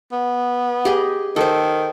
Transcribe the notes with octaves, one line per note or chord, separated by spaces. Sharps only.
B3
G4 G#4 D#5
D#3 A4 C5